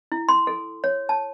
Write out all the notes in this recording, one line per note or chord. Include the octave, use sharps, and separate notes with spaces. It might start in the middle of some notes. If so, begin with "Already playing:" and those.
E4
C6
A4
C#5
A5